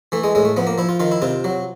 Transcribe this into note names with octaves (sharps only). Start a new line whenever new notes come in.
E3 A3
G#3
A2 G#3
A3
F3 B3
A#3
F3 E4
F4
D#3 F4
E4
C3 F4
F#3